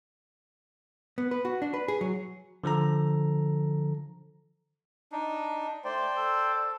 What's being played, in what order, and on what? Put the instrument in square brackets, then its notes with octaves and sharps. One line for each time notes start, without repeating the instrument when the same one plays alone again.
[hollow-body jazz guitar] B3
B4
F#4
D4
B4
G#4
F#3
[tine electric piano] D3 F3 A4 A#5
[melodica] D4 D#4
[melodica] A3 [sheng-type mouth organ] C5 D5 G5
[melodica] A4